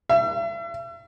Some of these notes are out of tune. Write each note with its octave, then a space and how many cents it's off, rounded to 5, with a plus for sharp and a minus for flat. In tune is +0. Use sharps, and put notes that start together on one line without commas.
E5 +40